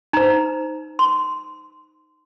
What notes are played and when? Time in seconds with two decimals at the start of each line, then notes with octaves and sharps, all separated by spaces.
0.13 D#4 C5 A#5
0.99 C6